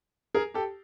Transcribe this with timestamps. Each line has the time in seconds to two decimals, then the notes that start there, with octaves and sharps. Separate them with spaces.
0.35 G#4 A#4
0.54 G4 A4